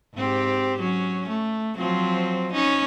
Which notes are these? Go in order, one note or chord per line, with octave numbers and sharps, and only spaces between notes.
G#2 C4 G4
F#3 C#4
A3
F3 F#3 C4
C#4 D#4